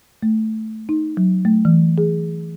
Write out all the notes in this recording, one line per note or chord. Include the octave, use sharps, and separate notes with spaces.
A3
D#4
F#3
A3
E3
G#4